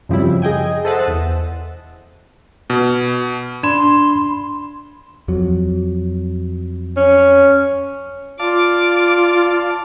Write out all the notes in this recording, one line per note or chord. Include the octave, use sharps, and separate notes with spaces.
F#2 C#3 F3 G3 C4 E4
G#4 D#5 G5 G#5
A4 C5 D#5 E5 F#5 A5
E2
B2
D4 B5 C6 G#6 E7
F2 F#3
C#4
F4 D5 F5 A5 D6